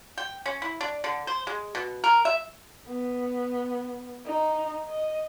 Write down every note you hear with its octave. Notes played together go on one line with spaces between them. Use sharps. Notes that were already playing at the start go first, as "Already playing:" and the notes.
G5
C#4
E4
D4
D3
C5
G#3
B2
A#4
E5
B3
D#4
D#5